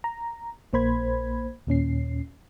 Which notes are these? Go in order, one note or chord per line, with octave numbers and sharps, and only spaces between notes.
A#5
A#1 A#3 C5 B5 G#6
D#2 A#2 C#4 C7